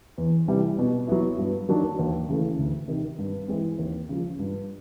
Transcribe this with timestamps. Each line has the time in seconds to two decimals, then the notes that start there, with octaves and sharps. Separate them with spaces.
0.18 E2
0.48 C3 E3 G3
0.78 B2
1.07 F#3 B3 E4
1.38 G2
1.69 D#3 F#3 A#3 D4
1.99 D#2
2.29 C#3 E3 A3
2.59 D2
2.88 C3 D#3
3.18 G2
3.48 E3 G#3 C4
3.79 D#2
4.09 C#3 F3
4.39 G2